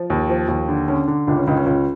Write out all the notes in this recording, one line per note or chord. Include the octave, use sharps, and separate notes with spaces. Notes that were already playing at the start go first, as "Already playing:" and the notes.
Already playing: F3
D#2
F3
D#2
D3
D3 C#4
D3
C#2 D4
C#4
C#2 D#4
C#4
C#2